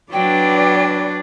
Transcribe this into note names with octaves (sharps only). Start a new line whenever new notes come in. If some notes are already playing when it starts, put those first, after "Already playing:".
F#3 D4 B4 D5 G5